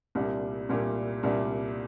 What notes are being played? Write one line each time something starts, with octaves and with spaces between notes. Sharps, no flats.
C2 A#2 G3 D4
C2 A#2 G3 D4
C2 A#2 G3 D4